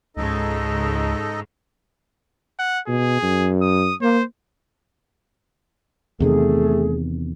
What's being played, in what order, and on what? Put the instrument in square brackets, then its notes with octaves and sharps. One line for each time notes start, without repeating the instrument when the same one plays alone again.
[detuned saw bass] C#2 [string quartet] G#2 C#3 [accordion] D#4 A4 D#5
[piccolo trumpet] F#5
[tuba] B2 [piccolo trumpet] G#4
[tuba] F#2
[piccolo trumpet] D#6
[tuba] A#3 [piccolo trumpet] C5
[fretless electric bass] E2 C3 D#3 [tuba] A3 [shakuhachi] G#4